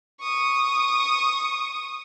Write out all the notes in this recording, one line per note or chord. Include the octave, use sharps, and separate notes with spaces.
C#6 D#6